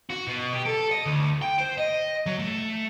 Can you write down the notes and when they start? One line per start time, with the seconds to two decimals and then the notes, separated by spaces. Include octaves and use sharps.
0.10 F#4
0.27 B2
0.53 G4
0.66 A4
0.91 D#5
1.06 D2
1.42 G5
1.59 C5
1.78 D#5
2.26 F#3
2.39 A3